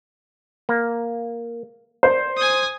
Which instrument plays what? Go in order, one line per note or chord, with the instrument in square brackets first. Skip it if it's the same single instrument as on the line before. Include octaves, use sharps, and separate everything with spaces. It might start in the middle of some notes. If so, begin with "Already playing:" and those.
[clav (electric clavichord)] A#3
[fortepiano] C5 [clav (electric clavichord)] D5
[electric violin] G#5 D#6